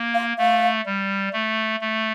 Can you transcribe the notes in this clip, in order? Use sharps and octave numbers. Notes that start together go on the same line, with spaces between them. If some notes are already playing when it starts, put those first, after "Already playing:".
Already playing: A#3
F5
A3 F5
G3
A3
A3